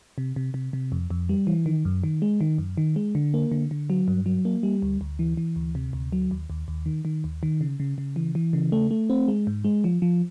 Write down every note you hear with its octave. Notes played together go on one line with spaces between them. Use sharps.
C3
C3
C3
C3
F2
F2
G3
E3
D#3
F#2
D#3
G#3
D#3
F#2
D#3
G#3
D3
A#3
D3
D3
F#3
G2
F#3
A#3
G3
D2
D2
E3
E3
D2
C3
D2
F#3
D#2
D#2
D#2
D#3
D#3
D#2
D#3
C#3
C#3
C#3
E3
E3
C#3
A3
A3
C4
G#3
G#2
G#3
F3
F3